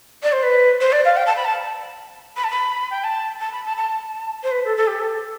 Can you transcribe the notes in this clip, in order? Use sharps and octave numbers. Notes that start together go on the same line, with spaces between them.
D5
C5
B4
C5
D5
F5
G5
A5
B5
A5
B5
A5
B5
G5
A5
A5
B5
A5
A5
C5
B4
A4
A4
G4
A4